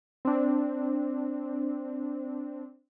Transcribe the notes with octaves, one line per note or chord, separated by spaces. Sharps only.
C4 D4